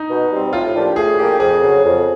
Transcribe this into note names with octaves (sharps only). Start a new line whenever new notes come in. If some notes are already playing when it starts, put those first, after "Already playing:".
Already playing: D#4
B2
G3 C4
A2 F4
F3 A#3 D4 G4
A2 G#4
F3 A#3 D4 G4
F2 G#4
C#3 F#3
F2